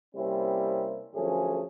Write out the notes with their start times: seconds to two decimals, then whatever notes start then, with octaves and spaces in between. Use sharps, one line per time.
0.15 C3 G3 A#3 C4 C#4 E4
1.14 F#2 D3 F3 A3 C#4 G#4